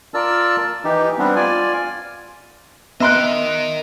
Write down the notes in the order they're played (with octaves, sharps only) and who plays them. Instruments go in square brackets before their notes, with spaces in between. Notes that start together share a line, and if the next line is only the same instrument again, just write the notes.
[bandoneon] F4 A#4 D5 A5 E6
E3 D#4 G4
G3 B3 C4 D4
F4 D5 G#5
[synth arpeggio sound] B3 [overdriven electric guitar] A#4 D#5 [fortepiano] E5 C6 F#6